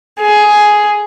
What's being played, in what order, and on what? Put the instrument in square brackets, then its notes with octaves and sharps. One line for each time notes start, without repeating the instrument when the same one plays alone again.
[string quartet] G#4